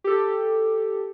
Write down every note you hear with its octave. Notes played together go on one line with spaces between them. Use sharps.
G4 A4